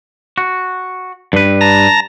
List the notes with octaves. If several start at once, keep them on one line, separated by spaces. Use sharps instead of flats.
F#4
G2 B4
A5 A#5 A#6